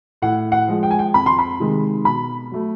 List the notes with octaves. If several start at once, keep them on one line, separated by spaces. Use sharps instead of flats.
A2 F#5
F#5
F3 G#3
G5
G#5
G5
F2 B5
C6
B5
C3 D#3 G#3
B2 B5
F#3 A3